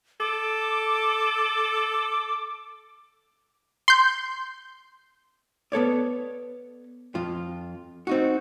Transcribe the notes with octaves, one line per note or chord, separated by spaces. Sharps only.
A4 D6
C6 G6
B3 A4 C#5 D5
F2 F4
C4 D#4 F#4